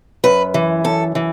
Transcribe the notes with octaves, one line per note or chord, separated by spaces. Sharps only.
F#2 B4
E3
F#2 A4
E3